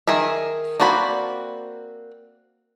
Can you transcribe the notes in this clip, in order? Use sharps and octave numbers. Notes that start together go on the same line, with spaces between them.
D#3 G#4 A#4 E5
A#3 C4 F#4 D5 B5